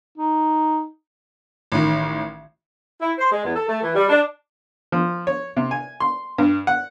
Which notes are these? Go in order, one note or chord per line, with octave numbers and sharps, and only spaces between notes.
D#4
A1 D#3
E4
C5
G#3
E2
A4
A3
E3
G3
D4
F3
C#5
C3
G#5
C6
G2
F#5